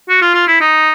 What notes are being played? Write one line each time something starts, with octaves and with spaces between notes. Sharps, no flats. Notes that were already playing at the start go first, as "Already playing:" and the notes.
F#4
F4
F4
E4
D#4